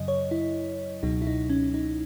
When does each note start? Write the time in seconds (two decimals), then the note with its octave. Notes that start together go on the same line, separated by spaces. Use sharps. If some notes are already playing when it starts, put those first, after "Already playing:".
Already playing: F#2 C#3 F#3 D#5
0.08 C#5
0.31 E4
1.03 C#2 B2 F#3 D#4
1.22 E4
1.27 D#4
1.50 C#4
1.74 D#4